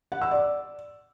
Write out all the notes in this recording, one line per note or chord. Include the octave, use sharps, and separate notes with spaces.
F#5
E6
D5